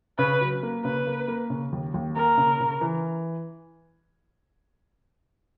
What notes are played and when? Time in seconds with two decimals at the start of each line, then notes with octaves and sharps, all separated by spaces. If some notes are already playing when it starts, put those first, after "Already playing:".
0.18 C#3 B4
0.41 F#3
0.63 A#3
0.84 C#3 B4
1.07 A#3
1.28 A#3
1.50 C#3
1.72 D#2
1.94 D#2
2.15 A#3 A#4
2.38 C#3
2.60 C#3
2.81 E3